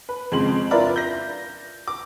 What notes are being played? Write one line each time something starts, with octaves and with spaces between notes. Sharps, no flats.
B4
F2 C#3 G#3 C6 F#7
D4 E4 F4 A#4 B4 D5
G6 A#6
D6